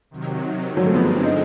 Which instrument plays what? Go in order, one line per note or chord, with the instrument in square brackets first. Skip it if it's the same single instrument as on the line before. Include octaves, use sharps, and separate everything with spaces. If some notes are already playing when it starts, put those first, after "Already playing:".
[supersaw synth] C3 D#3 F#3
G2 D3 F3 G#3 C4
[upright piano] F#3
A3
B3
D#4